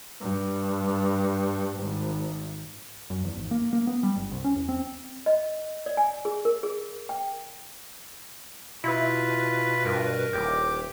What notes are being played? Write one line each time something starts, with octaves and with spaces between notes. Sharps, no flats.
G2
G#1
F#2
E2
G#1
A#3
A#3
B3
G3
G1
C2
C#4
E2
C4
D#5
D5
G#5
G#4
A#4
G#4
G5
B2 E4 F4 B4 B5
G2 A#4
D#1 A2 G4 D6 G6